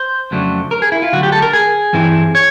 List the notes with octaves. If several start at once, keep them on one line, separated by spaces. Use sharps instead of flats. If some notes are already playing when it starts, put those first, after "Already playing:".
Already playing: C5
F2 C#3 F#3 A3 D4
A#4
G#4
E4
F4
D3 F#3 A3 F#4
G4
A4
A#4
G#4
G2 E3 G3 C4 E4
C#5